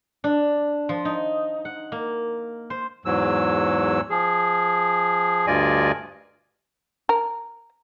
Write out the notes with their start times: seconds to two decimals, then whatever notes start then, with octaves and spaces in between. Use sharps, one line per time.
0.24 D4
0.89 F3
1.05 D#4
1.65 F#5
1.92 A#3
2.70 C5
3.05 E2 G#2 F#3 E6
4.10 F3 G#4
5.47 D2 G2 F4 D5 D#5 G#5
7.09 A#4